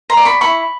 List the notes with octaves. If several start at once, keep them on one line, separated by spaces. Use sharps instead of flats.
A#5 C6
D5
B5 C#6
E4 B5 C#6